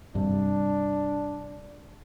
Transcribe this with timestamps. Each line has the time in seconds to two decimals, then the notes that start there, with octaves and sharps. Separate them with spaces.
0.15 G2 C3 D4